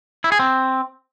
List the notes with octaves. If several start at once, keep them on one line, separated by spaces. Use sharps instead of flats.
E4
G#4
C4